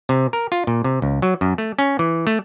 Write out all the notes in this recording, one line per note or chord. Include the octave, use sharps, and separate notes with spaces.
C3
A#4
F4
A#2
C3
C#2
F#3
F#2
A3
C#4
E3
A3